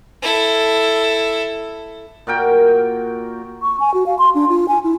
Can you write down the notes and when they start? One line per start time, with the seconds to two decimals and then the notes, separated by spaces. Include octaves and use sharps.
0.23 E4 A4
2.27 A#2 F#4 A#4 G5
3.62 C#6
3.80 G#5
3.94 F#4
4.06 F5
4.19 C6
4.35 D4
4.49 F4
4.68 G#5
4.84 E4